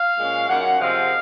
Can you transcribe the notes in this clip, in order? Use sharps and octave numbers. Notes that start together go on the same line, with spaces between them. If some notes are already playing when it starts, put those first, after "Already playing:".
Already playing: F5
A#2 G#3 C#4
F#2 D#3 A#3 C#4 F#5
C3 F3 G#3 C4 F5